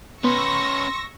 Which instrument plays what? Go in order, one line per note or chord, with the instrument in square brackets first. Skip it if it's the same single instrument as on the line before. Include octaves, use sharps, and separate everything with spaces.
[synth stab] B3 [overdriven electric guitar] C#4 B4 [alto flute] C6 [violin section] C#6 E6 A#6